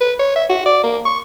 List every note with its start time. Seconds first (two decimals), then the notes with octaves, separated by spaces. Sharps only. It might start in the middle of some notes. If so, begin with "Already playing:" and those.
0.01 B4
0.19 C#5
0.36 E5
0.50 F#4
0.66 D5
0.84 A#3
1.06 C#6